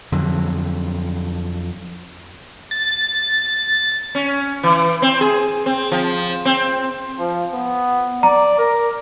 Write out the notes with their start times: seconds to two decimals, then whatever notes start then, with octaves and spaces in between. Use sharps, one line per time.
0.12 F2 D3 F#3
2.71 A6
4.15 C#4
4.63 E3
5.02 C4
5.21 G#4
5.66 C4
5.92 F3
6.45 C4
7.19 F3
7.54 B3
8.23 D5 A#5
8.58 A#4